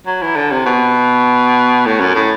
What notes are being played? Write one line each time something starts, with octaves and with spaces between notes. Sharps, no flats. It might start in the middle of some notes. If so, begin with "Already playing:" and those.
F#3
E3
D3
C3
B2
A2
F#2
A2